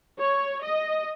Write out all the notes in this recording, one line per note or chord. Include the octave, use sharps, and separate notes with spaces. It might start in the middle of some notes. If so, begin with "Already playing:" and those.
C#5
D#5